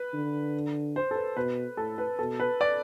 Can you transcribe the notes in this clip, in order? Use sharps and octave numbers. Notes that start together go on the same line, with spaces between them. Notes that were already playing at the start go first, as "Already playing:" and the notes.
Already playing: B4
D3
C5
A4
B4
B2 B4
A2 A4
B4
B2 A4
B4
D5